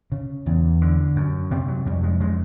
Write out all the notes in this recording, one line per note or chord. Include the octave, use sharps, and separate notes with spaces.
C#3
E2
D3
F#2
C3 C4
F#3
F2 G3
G#3
C#3 G#3